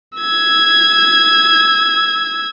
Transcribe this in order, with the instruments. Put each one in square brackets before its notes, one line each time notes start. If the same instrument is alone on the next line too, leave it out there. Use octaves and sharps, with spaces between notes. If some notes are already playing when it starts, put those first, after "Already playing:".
[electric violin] E6 G#6